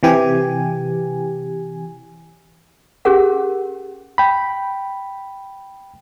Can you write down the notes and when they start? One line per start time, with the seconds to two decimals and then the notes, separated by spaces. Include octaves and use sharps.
0.03 C3 E3 G4 G#5
3.05 C#4 G4 G#4 A#4 F#5
4.18 G5 B5